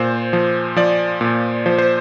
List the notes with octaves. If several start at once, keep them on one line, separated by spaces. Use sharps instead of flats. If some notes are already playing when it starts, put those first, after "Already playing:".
Already playing: A#2 C5
F3
F3 D5
A#2
F3 C5
C5